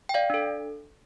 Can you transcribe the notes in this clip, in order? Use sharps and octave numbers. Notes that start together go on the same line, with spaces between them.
G5
D5 F5
D4 A4